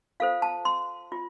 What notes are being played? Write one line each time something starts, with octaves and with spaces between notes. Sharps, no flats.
F4 A4 C5 F5
A5
C6
F4